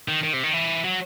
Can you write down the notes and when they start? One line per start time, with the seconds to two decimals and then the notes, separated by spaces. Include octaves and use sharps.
0.08 D#3
0.23 D#3
0.33 C3
0.43 D#3
0.53 E3
0.84 F#3